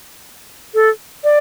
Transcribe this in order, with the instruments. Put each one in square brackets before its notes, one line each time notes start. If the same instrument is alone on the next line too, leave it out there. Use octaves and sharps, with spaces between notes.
[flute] A4
D5